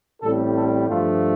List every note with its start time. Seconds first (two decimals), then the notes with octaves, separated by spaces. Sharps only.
0.22 A1 A2 G3 C4 A4
0.55 A4
0.88 G2 F3 A3 F4